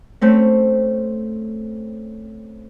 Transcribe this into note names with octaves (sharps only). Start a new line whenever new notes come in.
A3 C4 C#4